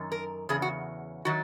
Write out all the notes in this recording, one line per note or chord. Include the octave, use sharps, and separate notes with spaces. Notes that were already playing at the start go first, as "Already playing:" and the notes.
Already playing: F#2 D#3
A#4
E2 C#3 G#4
F#4
D#3 F#3 F#4